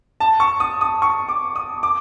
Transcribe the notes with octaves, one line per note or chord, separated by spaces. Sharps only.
A5
C#6
D#6
D#6
C#6
D6
D#6
D6